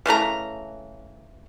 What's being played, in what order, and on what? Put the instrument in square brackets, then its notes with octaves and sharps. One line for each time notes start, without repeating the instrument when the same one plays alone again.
[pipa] C#3 E3 A3 A#5